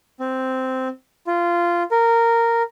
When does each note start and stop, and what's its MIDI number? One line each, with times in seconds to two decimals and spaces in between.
0.20 0.88 60
1.27 1.83 65
1.91 2.62 70